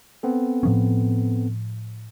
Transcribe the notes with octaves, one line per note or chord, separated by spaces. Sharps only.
B3 C4 A4
A2 F3 C#4